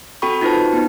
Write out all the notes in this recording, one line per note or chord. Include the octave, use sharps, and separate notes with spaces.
C4 F#4 A4 G5 B5 C#6
D#4 F4 F#4 B4 C5 A5
B3 C4 D#4